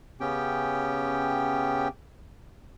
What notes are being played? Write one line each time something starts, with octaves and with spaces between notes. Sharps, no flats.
C#3 B3 C#4 G4 G5